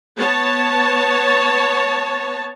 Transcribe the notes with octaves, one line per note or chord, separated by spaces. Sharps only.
B3 C#5 A5